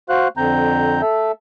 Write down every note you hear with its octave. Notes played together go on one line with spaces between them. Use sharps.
F#4 C5 F5 F#6
F2 D3 C4 A#5 G6
A4 E5